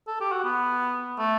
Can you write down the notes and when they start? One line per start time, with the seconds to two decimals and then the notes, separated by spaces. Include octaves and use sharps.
0.08 A4
0.20 G4
0.32 F#4
0.44 B3
1.18 A3